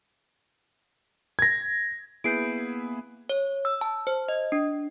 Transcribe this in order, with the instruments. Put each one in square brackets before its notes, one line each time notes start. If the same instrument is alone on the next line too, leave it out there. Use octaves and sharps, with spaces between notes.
[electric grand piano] G#6 A#6
[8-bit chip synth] A#3 B3 [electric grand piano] E4 G#4 B4 [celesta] G6 C7 D7
[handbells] C#5
E6
A5
C5
D#5
D4